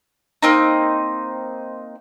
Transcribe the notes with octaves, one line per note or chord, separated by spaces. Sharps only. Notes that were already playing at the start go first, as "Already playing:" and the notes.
A#3 C4 D#4